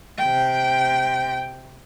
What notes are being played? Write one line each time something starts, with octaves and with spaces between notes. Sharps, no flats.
C3 G5